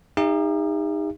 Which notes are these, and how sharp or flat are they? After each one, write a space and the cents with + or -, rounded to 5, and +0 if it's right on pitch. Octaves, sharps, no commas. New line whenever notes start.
D#4 +0 G4 +45 E5 +45